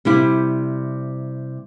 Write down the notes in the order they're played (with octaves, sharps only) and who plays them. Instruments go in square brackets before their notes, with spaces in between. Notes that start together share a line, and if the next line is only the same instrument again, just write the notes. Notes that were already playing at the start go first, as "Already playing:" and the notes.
[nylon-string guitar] C3 G3 E4